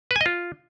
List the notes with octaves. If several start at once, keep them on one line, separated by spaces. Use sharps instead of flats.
B4
G#5
D#5
F4